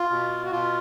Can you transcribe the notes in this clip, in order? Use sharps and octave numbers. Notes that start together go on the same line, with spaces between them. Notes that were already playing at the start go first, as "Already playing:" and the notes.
Already playing: F4
B2
F#4
B2 F4